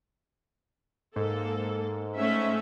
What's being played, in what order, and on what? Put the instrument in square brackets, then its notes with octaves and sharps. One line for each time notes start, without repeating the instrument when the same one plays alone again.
[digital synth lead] G#2 [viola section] A#3 A4
[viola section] A3 C#4 E5